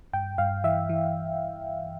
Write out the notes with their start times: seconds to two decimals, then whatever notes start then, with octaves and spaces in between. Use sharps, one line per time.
0.13 G2 G5
0.38 G2 F5
0.64 E3 E5
0.89 E3